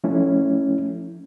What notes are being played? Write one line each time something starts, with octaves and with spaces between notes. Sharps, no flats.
F3 A3 C#4 E4